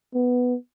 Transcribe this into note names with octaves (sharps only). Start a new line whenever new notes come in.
B3